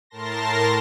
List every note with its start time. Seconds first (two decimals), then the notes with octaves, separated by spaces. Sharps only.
0.10 A2 A#4 A5 C6 A#6